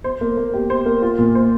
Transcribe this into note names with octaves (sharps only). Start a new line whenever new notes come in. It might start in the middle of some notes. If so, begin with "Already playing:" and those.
C5
A#3
A#3
G4
C5
A#3
F4
A#2
C5